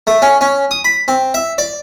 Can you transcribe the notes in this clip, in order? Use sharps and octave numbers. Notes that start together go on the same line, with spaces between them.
A3
C#4
C#4
D#6
B5
C4
E5
D5